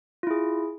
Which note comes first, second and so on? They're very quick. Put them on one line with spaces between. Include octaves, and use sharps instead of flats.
F4 E4 G#4